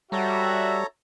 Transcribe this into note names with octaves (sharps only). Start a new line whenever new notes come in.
G3 F#4 A4 C#5 E5 A#5